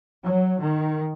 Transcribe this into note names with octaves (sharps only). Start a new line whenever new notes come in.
F#3
D#3